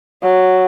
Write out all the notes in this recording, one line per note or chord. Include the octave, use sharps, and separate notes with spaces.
F#3